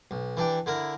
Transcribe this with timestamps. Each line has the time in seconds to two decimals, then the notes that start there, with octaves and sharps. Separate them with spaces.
0.11 B1
0.37 E3 D4 G4
0.66 D3 E4 A#4